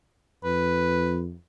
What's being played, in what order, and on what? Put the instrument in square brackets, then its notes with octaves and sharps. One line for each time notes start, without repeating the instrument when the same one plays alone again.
[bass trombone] F2 [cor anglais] B4